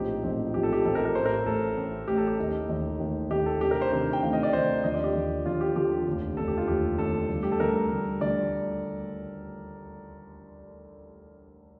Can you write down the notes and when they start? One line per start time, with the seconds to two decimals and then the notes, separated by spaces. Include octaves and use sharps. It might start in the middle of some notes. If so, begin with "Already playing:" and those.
Already playing: A#1 A2 F3 C4 D#4 G4
0.23 A#1 A2 F3 C4 D#4
0.54 A#1 A2 F3 C4 D#4 G4
0.63 A4
0.73 G4
0.85 A#1 A2 F3 C4 D#4 A4
0.95 A#4
1.05 A#4
1.15 A1 A2 A3 C5
1.26 A#4
1.46 A1 A2 A3 A4
1.77 A1 A2 A3
2.08 A1 A2 A3 G4
2.18 A4
2.28 G4
2.38 D#2 D#3 A3 D#4
2.69 D#2 D#3 A3 D#4
3.00 D#2 D#3 A3 D#4
3.30 D#2 D#3 A3 D#4 G4
3.46 A4
3.61 D2 C3 D#3 A3 D4 G4
3.71 A#4
3.82 C5
3.92 D2 C3 D#3 A3 D4 C5
4.13 G5
4.22 D2 C3 D#3 A3 D4 F5
4.33 D#5
4.43 D5
4.53 D2 C3 D#3 A3 D4 C5
4.84 D#2 D3 F3 D#5
4.94 D5
5.04 G4
5.15 D#2 D3 F3
5.46 D#2 D3 F3 F4
5.61 G4
5.76 D#2 D3 F3 G4
6.07 F1 D#2 D3
6.37 F1 D#2 D3 A4
6.48 G4
6.58 F4
6.68 F1 D#2 D3 G4
6.98 F1 D#2 D3 A4
7.29 D2 D3 G3
7.43 G4
7.52 A4
7.60 D2 D3 G3 A#4
7.91 D2 D3 G3
8.21 D2 D3 G3 D5